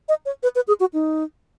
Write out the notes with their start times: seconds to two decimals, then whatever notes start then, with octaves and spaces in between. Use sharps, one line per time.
0.09 D#5
0.26 C#5
0.43 B4
0.55 B4
0.68 G#4
0.80 F#4
0.93 D#4